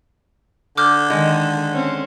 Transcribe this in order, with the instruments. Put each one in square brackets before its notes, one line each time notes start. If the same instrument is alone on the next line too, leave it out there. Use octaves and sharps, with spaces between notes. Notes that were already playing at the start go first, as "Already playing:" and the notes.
[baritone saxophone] D3 [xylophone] D6 F6 G6
[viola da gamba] D#3 [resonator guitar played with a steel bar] G#3
[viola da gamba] C4 C#4